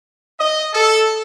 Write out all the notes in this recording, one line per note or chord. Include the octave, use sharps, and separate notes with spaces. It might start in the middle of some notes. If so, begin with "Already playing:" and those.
D#5
A4